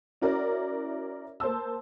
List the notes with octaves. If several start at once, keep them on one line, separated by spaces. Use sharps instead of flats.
C#4 E4 F#4 A#4 D5
A#3 C5 A5 E6